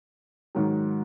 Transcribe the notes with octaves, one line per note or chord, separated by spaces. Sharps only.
G#2 D#3 F#3